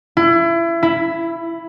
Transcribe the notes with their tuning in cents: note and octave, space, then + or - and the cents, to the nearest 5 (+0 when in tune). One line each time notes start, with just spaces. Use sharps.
E4 +30
E4 +5